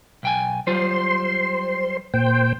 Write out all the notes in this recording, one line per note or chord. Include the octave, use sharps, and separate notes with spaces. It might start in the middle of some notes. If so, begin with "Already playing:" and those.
B1 G5 G#5
F#3 G3 F4 C5 C6
A#2 C5 G5